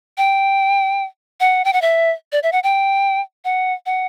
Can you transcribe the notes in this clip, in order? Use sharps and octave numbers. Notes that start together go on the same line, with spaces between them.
G5
F#5
G5
F#5
E5
D5
E5
F#5
G5
F#5
F#5